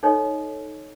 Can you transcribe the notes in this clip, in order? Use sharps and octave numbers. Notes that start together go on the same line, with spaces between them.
D#4 A4 C#5 D#5